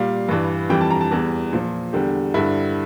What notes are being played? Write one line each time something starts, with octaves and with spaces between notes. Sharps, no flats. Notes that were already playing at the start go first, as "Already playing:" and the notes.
Already playing: A#2 G3 F5
G2 E3 G3
F2 E3 G3 G5
A5
A#5
A5
E2 E3 G3
A#2 F3
E2 D3 G3 G4
G2 D3 G3 E4